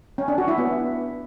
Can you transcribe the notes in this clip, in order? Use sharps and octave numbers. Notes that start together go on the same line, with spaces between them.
C#4
D4
F#4
E4
B3